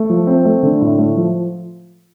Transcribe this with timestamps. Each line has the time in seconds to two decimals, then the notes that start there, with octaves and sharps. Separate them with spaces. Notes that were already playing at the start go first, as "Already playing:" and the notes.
Already playing: A3
0.10 F3
0.27 C4
0.45 A3
0.63 D3
0.81 A2
0.98 A3
1.17 F3